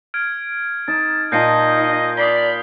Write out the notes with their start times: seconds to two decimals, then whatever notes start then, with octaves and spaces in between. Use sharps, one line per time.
0.14 F6 G#6 D7
0.88 D#4 A5
1.32 A#2 D#4 F4 D#5 A5 G6 C7 C#7
2.17 D5 B5 D#6 C7 G7